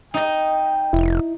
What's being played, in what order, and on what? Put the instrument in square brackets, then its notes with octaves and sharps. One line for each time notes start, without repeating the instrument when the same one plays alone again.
[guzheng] D#4 D#5 [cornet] G5
[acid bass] F1 [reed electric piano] E4